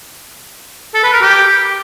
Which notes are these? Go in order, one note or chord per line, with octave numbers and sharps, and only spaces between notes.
A4
B4
A#4
G4